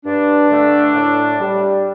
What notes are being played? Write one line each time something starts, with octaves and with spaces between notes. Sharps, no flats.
G2 D4
D3 A3
A2
G3